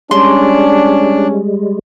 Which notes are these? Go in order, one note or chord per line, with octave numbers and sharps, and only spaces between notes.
G3 G#3 C#4 D4 C6